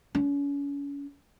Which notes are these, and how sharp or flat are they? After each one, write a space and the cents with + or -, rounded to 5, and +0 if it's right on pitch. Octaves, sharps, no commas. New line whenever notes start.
C#4 +35